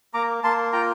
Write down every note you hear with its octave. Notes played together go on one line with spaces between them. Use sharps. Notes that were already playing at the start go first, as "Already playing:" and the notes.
A#3 A#5 D6
A#3 A5 C6
F4 G5 A#5